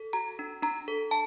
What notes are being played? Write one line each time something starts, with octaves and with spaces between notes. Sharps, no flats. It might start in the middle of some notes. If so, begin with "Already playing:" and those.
Already playing: A4
F#4 A#5
D4
D4 A#5
A4
A5